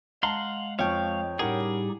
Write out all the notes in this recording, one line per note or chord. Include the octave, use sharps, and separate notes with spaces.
G#3 F5 F#5 A5 A#5 C6
F2 F3 C#5 F5 G5 C#6
A2 G3 C#4 D#4 G4 G#4 A#4 F#5